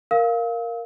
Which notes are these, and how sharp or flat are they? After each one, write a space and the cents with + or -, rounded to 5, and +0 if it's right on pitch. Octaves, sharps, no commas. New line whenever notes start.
A#4 +0 F5 +0 E6 -45